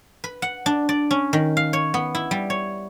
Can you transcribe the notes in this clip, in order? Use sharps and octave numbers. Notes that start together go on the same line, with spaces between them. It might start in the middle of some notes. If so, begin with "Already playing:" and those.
B4
F#5
D4
D5
C#4
D#3
F5
C#5
B3
E4
G3
C#5